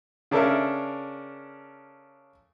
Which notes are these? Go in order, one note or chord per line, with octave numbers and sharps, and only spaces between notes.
C#3 D4 A4 A#4 E5